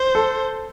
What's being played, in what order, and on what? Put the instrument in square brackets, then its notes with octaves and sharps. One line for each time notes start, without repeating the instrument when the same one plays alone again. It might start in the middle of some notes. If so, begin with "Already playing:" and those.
Already playing: [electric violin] C5
[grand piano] A4